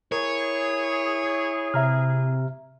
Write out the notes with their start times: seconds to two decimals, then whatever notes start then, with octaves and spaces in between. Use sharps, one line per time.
0.12 E4 G#4 A#4 C#5
1.74 C3 E5 A#5 F6